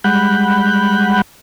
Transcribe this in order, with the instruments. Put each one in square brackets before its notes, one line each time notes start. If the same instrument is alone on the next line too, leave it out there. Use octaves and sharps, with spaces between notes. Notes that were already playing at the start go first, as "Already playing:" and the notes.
[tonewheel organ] G3 G#3 F#5 B5 F#6 G6